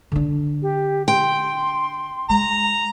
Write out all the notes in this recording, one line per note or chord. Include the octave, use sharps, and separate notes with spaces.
D3 D4
G4
G5 C6
G#3 A#5